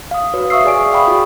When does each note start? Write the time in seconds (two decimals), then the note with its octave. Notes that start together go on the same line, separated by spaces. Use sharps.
0.11 F5 D#6
0.34 F#4 B4 C#5
0.50 E5 F5 C#6 D#6 E6 C7
0.64 G#4 D5 G#5 D7
0.92 F5 G5 B5 C#6 D#6
1.07 F4 F#4 G#4